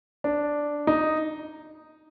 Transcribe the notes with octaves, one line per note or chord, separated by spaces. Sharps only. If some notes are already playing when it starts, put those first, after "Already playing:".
D4
D#4